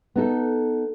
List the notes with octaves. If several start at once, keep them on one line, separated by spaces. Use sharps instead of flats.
B3 D#4 A4